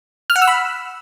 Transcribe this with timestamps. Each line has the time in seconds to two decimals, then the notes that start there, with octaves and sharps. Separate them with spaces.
0.30 F6
0.36 F#5
0.42 E6
0.47 B5